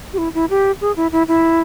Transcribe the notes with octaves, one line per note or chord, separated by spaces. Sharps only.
G4
E4
E4
G4
G#4
E4
E4
E4